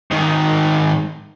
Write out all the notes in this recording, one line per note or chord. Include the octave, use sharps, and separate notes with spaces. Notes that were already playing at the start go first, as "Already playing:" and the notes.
G#2 D#3